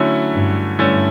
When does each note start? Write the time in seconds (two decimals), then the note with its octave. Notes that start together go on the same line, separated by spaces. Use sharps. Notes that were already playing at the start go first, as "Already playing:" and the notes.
Already playing: D3 F#3 A3 C#4 E4
0.33 G2
0.79 G2 D3 A3 C#4 E4